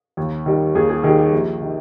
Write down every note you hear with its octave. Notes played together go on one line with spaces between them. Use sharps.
D#2
D#3 G3
D#2 G#4
G#4
D#3 G3 G#4
G4
A#1
D#3